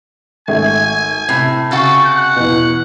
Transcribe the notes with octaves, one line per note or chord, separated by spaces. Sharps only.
G#1 A3 E5 G#5
A2 C3
C#3 F#4 A4
F#5
E2 B2